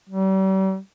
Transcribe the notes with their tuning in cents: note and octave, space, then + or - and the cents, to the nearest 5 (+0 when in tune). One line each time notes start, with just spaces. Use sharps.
G3 -40